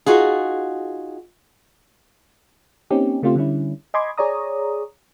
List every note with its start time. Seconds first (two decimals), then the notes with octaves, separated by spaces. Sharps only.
0.06 D#4 F4 F#4 G#4
2.91 A#3 C4 C#4 D#4 G4
3.22 C#3 A3 C4 F4 G4 C5
3.36 D3 G3 C#4 E4
3.94 D#5 G#5 B5 C6 D6 G#6
4.18 G#4 C#5 D5 A#5 D#6